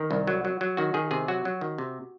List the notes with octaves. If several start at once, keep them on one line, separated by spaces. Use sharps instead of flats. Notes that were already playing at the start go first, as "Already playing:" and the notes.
Already playing: D#3 A#4
C2
F#3
F#3
F#3
D#3 F#4
D#3 G#4
C3 G#4
F#3 F#4
F#3
D#3
C3